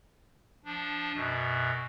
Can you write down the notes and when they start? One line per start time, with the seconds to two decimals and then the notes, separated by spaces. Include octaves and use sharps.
0.65 F3 D4
1.14 F#2 B2